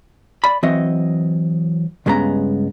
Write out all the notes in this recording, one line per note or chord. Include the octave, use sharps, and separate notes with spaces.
D5 B5
E3 F#3 C4 D#5
C#2 G2 G#3 B3 C#4 A#5